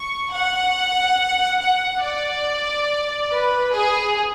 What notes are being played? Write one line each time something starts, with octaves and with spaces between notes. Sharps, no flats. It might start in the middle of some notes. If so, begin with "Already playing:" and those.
Already playing: C#6
F#5
F#5
D5
B4
G#4